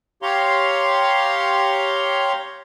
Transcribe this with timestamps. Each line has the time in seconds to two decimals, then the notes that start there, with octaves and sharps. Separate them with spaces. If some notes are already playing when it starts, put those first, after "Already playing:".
0.22 G4 C#5 F5 A#5 C6